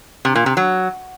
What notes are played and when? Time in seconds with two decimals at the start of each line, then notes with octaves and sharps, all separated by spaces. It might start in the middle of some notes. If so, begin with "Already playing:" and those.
0.25 C3
0.35 A#2
0.46 C3
0.57 F#3